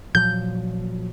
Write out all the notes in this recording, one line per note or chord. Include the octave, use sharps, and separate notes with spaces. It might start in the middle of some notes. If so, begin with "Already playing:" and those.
A#2 F3 F#3 G6